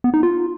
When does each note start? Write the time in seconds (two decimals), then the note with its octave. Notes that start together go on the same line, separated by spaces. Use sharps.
0.04 B3
0.14 D#4
0.23 F4